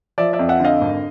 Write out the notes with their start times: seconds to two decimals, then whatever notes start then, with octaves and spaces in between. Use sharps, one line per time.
0.18 F3 D5 E5
0.33 D5 E5
0.39 F2
0.49 E5 F#5
0.60 D3 D#5 F5
0.81 G#1